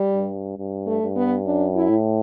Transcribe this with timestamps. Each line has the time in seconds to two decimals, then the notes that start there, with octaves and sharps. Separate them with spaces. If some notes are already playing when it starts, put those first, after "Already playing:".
Already playing: G3
0.13 G2
0.58 G2
0.87 A3
1.02 G2
1.16 B3
1.46 F#2 D4
1.75 E4
1.89 A2